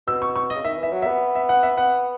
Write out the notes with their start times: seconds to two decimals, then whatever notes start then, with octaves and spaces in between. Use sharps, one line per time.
0.07 B2 E6
0.22 C#6
0.36 C#6
0.50 C#3 D#5
0.64 D#3 E5
0.78 E3 E5
0.93 F#3
1.02 B3 E5
1.35 E5
1.49 F#5
1.63 E5
1.77 B3 F#5